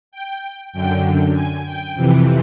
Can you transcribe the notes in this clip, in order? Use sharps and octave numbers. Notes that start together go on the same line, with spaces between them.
G5
F#2 D3 G5
G#5
G5
F2 C3 E3